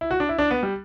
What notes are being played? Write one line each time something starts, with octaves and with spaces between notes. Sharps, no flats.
E4
F#4
D4
E4
D4
B3
G3